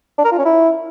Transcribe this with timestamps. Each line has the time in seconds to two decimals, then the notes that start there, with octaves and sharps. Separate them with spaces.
0.18 D4
0.25 A#4
0.32 F4
0.39 C#4
0.45 E4